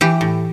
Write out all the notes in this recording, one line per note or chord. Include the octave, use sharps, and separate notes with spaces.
E3 G4
A2